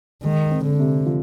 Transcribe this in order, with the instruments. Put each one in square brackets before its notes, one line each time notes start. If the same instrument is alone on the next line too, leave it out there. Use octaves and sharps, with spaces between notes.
[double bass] D#3 [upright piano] G#3
[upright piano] C4
[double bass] D3
[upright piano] C3
F3